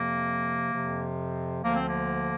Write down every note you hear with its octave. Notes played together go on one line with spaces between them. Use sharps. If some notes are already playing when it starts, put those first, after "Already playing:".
Already playing: F2 C3 F3 A#3
F2 C3 F3
D2 D3 F3 A#3
C4
A#3